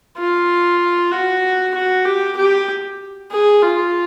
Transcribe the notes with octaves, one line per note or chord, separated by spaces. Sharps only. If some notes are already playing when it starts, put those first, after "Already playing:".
F4
F#4
F#4
G4
G4
G#4
F4